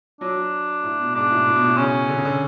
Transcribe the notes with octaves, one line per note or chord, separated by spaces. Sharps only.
F#3 D4
F#3
A2
B2
G#2 D4
B2
A2
A2
B2
A2
C#3 C#4
D3
C#3
D3